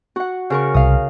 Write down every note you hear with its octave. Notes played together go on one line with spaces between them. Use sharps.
F#4 F#5
C#3 A#4 C#6
C2 F5 D#6